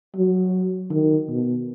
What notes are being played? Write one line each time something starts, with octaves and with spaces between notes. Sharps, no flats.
F#3
D#3
B2